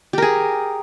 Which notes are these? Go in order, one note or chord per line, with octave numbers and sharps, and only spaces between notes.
G4 G#4 A#4